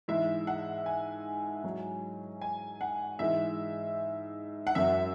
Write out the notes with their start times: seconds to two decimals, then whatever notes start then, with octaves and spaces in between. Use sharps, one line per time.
0.08 G#2 E3 G#3 E5
0.47 F#5
0.86 G#5
1.64 G#2 F#3
2.41 G#5
2.81 F#5
3.19 G#2 E3 G#3 E5
4.67 F#5
4.75 F#2 F#3 E5